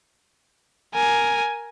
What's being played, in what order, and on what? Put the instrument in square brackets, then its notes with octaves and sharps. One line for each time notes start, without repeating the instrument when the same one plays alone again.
[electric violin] A#4 G#5